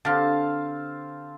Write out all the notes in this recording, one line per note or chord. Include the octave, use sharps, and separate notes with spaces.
D3 C4 G4 F5 A5